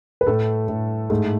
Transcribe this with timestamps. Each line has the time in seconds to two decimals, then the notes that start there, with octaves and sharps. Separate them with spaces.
0.21 B4
0.27 A2 A3 A4
0.68 A2
1.10 G#2 A3 A4